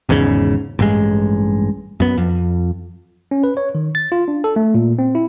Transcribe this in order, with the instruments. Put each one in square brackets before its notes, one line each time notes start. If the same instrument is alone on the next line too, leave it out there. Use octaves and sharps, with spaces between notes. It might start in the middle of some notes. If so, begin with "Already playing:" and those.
[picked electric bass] G#1 E2 G#2 C#3
A1 G2 G#3
F#2 B3
F2
[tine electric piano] C#4
B4
C#5
D#3
A6
F4
D4
A4
A3
A#2
C4
E4